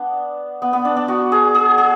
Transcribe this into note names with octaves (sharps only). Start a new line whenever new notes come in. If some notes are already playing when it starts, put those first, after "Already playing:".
Already playing: B3 D4
B3
B3
D4
D4
F#4
G#4
G#4
G#4